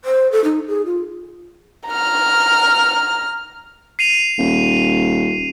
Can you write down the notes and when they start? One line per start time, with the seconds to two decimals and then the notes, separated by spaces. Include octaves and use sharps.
0.05 C5
0.32 A4
0.44 D#4
0.68 G#4
0.86 F4
1.87 A#5 F6
3.99 C7 D#7 F7
4.38 D#1